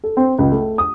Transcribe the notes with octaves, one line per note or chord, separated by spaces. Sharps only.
A4
C4
C#2
A3
D#6